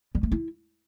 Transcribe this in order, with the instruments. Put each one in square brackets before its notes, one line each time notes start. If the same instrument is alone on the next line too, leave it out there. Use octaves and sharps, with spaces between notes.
[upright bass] G3
A3
E4